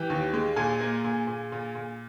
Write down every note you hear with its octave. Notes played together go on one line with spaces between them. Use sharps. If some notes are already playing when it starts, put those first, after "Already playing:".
Already playing: E3 G4 G5
D#2
G#3
A#2 G#4 G#5
A#3
A#2
A#2
A#2
A#2